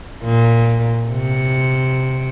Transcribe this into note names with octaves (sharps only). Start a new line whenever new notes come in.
A#2
C3